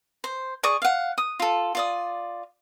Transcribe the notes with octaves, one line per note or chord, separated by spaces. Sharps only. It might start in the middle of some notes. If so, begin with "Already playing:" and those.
C5
G#4 D5 C#6 D#6
F5 F#5
D#6
F4 A4
F4 D5 D#6